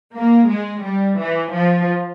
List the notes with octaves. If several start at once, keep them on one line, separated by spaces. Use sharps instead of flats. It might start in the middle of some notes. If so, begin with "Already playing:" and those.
A#3
G#3
G3
E3
F3